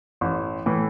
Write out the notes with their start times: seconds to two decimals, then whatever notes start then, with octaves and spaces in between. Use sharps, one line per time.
0.21 A1
0.66 A2 E3